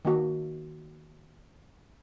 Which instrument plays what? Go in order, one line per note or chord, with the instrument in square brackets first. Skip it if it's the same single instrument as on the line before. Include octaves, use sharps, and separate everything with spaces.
[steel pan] D#3 A#3 F#4